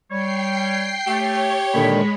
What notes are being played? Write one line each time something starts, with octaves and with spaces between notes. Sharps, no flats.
G3 C#5 G5 C7
A3 G4 C#5
A#2 D3 D#3 G#3 B5